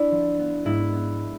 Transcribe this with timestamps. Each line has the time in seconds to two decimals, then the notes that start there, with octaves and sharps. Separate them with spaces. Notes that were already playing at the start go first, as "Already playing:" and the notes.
Already playing: D4 E4
0.11 F3
0.39 B3
0.65 G#2 E4
0.93 B3